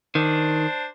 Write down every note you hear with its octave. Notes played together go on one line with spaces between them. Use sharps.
D#3 D4 C5